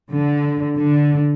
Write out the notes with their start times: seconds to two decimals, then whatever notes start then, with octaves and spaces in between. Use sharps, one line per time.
0.11 D3
0.78 D3